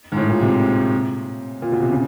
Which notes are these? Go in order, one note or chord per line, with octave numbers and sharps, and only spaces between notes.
G#2
A2
A#2
C3
A#2
B2
C3
C#3